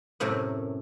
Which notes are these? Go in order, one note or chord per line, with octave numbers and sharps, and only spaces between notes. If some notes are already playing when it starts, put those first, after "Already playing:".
F#2 A2 C3 A3 C#4 A#4